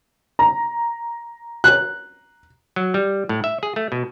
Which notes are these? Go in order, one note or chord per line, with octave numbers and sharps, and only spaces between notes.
A#5
F#6
F#3
G3
A2
E5
G#4
A3
B2